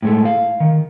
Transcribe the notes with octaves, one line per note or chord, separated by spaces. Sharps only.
A2 G#3 A3
F5
D#3